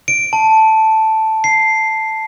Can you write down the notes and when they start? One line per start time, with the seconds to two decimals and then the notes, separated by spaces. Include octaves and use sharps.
0.08 D7
0.33 A5
1.44 C7